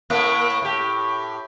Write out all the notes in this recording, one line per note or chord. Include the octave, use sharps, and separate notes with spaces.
A2 A3 A#3
A2 G4